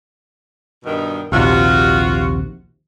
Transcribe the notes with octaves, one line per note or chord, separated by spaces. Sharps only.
G2 B2 D#3
A#1 D#2 C3 F4 F#4